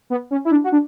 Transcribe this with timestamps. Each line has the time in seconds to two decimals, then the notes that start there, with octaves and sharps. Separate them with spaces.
0.10 B3
0.31 C#4
0.45 E4
0.51 D4
0.64 F#4
0.72 D4